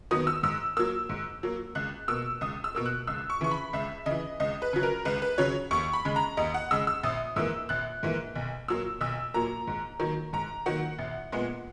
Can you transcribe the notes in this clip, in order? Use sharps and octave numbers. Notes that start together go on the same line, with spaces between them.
D#3 F#3 B3 D#6
E6
G#2 E6
F#3 A#3 E6
G#2
F#3 A#3
C#2 F#6
B2 A#3 E6
C#2 D#6
E6
B2 A#3 E6
F#6
C#2 E6
C#6
C#3 E3 C#6
B5
C#2 E5
C#3 E3 D#5
C#2 D#5
B4
C#3 F#3
A#4
C#2 B4
B4
C#3 F#3 C#5
D#2 C#6
B5
C#3 G#3
A#5
D#2 D#5
F#5
C#3 G#3 E6
E6
A#1 D#6
G#2 E3 A#3 E6
A#1 F#6
G#2 E3 A#3
B1
A#2 F#3 A#3 E6
B1 E6
A#2 F#3 A#3 A#5
G#2
D#3 F#3 A#3
G#2 A#5
D#3 F#3 A#3 F#5
A#1
A#2 G#3 B3